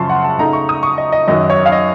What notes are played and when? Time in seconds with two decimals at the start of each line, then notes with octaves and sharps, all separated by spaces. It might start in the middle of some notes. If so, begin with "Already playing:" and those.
Already playing: F#2 C#3 F3 A5 C6 C#6
0.09 F#5
0.24 A5
0.39 C#3 A3 D#4 A#5
0.53 C#6
0.69 D#6
0.83 C#6
0.98 D#5
1.12 D#5
1.28 F#2 D#3 F#3 D#5
1.50 C#5
1.66 F5
1.72 D#5